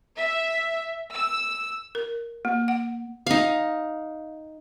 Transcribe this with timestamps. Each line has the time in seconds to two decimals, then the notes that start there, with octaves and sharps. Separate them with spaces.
0.17 E5
1.14 E6
1.95 A#4
2.45 A#3
2.68 F#5
3.27 D#4 F5